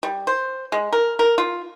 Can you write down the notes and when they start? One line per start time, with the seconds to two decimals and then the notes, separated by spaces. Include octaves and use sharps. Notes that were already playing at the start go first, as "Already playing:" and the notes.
0.03 G3
0.27 C5
0.72 G#3
0.93 A#4
1.19 A#4
1.38 F4